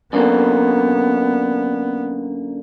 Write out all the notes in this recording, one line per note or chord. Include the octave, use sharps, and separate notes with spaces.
F#2 D3 A#3 B3